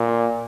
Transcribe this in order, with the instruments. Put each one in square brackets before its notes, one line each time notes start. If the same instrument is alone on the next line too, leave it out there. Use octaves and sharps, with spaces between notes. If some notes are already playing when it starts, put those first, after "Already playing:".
Already playing: [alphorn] A#2